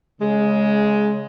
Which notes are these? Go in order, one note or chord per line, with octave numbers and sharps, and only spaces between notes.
C#3 G#3